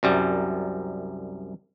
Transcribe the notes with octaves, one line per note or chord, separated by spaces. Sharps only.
C2 F#2 G3